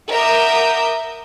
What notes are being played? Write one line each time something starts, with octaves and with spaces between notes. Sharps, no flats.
A#4 E5 F#5 D6 D#6 G6